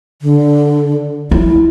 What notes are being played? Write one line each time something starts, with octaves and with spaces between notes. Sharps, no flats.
D3
E4 F4